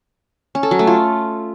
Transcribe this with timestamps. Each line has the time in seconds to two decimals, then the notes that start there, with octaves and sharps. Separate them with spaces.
0.55 C#4
0.63 A4
0.71 F#3
0.79 A3
0.87 F4